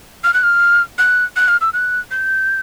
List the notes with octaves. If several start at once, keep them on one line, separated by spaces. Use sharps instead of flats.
F6
F#6
F6
F#6
F#6
F6
E6
F#6
G6